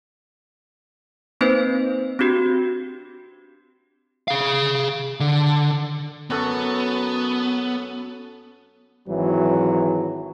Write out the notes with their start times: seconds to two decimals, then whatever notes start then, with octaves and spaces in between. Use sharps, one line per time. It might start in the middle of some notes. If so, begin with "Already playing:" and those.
1.41 A#3 C4 D#4 B4 C5
2.19 C4 D4 F#4 G4
4.28 G#4 F5
5.20 D3
6.30 F#2 B3 F#4 A4
9.08 G#1 E3 F#3